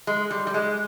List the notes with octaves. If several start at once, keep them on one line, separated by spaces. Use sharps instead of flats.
G#3
G3
G3
G#3